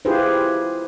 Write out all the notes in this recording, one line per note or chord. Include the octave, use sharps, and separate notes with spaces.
E4 F4 G4 G#4 B4 C5